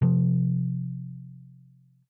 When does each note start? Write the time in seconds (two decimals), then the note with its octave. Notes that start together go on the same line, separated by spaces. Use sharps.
0.02 C3 F3